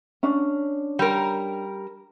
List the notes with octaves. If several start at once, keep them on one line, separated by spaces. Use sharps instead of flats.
C#4 D4
G3 A#4